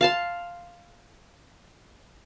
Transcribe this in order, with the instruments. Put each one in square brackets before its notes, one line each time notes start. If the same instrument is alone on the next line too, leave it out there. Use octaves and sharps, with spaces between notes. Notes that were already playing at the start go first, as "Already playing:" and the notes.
[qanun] F5 A5 C6